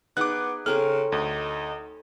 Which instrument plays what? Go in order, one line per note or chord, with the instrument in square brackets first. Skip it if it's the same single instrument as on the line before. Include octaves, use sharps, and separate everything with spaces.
[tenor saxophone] B3 [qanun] D#4 G#4 F#5 [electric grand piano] D6 F#6
[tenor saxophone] C#3 [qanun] C4 A#4 C#5 [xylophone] A4 [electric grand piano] F6
[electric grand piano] D2 [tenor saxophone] D#4